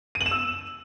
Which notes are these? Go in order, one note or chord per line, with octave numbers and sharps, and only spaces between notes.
D#7
F#7
E7
E6